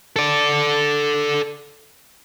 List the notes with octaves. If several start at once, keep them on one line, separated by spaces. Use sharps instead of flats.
A4 D5